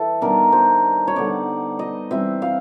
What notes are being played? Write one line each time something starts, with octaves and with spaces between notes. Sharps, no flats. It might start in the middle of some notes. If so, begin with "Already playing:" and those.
Already playing: E3 A4
D#3 G3 B3 D4 A#4
C5
C#5
D3 G3 B3 D#4 D5
D#5
E3 G3 C4 E5
F5